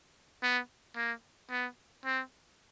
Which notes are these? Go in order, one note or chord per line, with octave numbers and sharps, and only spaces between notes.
B3
A#3
B3
C4